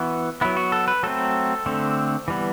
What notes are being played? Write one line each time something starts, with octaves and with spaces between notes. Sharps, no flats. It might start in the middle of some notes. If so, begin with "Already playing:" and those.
Already playing: E3 B3 F#4
F#3 B3 E4
F#4
A4
B4
F#3 A3 C4 A4
D3 A3 C4
E3 G3 B3